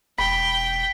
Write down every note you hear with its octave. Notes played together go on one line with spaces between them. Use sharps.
E1 G5 B5 B6